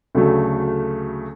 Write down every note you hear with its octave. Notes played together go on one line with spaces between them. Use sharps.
D2 C#3 F#3 A3